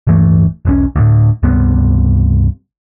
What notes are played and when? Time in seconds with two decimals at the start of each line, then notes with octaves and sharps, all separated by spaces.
0.07 D1 G2 E3 A3
0.65 E1 B1 C#4
0.96 D2 A2
1.43 C#2 G2 C3 B3